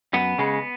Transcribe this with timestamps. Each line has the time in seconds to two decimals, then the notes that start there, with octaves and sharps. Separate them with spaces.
0.14 F#2 B3
0.39 C#3 G#3